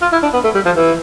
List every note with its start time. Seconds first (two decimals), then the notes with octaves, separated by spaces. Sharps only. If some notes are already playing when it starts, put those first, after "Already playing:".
0.02 F4
0.12 E4
0.23 D4
0.34 B3
0.44 A3
0.55 G3
0.65 F3
0.76 E3